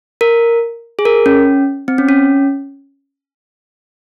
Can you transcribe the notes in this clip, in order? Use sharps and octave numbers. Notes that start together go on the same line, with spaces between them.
A#4
G#4
A#4
C#4
C4
C#4
C#4